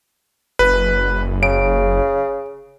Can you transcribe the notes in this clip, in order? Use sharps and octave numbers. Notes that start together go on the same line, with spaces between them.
F#1 B4
C#3 D7